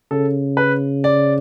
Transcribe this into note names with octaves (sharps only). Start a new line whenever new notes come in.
C#3 A4
B4
D5